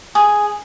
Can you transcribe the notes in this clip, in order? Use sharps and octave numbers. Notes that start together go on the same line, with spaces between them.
G#4